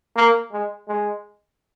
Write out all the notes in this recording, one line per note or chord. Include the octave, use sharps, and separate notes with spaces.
A#3
G#3
G#3